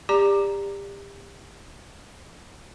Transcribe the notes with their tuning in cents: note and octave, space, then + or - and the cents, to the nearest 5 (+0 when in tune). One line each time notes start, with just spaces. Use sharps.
G4 +30 D5 +0 A#5 +0